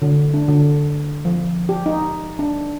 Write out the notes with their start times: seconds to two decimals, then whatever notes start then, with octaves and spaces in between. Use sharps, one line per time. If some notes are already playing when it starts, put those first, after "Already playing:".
0.02 D3
0.34 D4
0.48 D3
1.25 F3
1.69 G4
1.86 D#4
2.39 D4